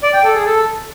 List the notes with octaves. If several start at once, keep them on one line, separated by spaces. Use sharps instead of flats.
D5
G5
A4
G#4
A4